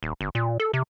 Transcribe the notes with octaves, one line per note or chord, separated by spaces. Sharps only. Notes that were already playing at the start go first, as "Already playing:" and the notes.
D#1
G1
A#2
A4
C3